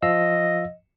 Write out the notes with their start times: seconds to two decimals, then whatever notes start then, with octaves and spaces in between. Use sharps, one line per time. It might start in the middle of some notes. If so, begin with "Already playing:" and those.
0.02 F3 D#5 F5 E6